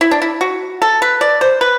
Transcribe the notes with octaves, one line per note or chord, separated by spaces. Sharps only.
E4
D4
E4
F#4
A4
B4
D5
C5
B4